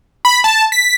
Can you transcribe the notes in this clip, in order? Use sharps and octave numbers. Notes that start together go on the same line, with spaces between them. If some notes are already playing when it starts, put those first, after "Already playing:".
B5
A5
B6